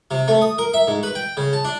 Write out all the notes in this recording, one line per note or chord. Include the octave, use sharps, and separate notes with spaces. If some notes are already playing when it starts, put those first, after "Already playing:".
C3
A3
D#6
A#4
E5
G#2
B4
G5
C#3
A5
D4